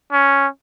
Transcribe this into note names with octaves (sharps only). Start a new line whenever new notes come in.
C#4